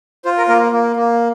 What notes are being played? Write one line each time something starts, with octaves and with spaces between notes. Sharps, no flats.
F4 C5
A#4
A#3 A#4
A#3
A#3